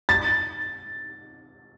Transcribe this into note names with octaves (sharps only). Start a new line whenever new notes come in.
A6